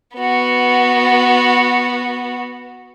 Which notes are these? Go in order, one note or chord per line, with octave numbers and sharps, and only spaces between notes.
B3 F#4